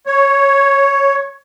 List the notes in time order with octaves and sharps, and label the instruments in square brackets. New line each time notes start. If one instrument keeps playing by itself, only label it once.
[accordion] C#5